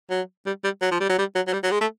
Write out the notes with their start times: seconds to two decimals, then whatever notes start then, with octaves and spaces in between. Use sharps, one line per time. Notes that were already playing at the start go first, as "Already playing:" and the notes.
0.10 F#3
0.46 G3
0.64 G3
0.82 F#3
0.91 F3
1.00 G3
1.09 F#3
1.18 G3
1.35 F#3
1.47 F#3
1.53 G3
1.63 F#3
1.71 G#3
1.81 A3